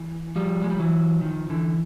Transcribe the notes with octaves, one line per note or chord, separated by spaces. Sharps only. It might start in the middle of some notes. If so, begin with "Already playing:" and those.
Already playing: E3
F3 G3
G#3
G3
E3 F#3
D#3 F3
D3 E3